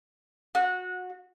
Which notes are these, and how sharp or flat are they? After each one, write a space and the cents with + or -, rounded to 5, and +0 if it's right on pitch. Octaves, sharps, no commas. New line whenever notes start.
F#4 -20